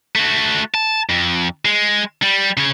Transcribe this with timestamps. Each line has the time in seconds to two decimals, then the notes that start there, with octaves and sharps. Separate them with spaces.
0.16 A3 F#4
0.74 A5
1.09 F2
1.65 G#3
2.22 G3
2.57 C#3 C#5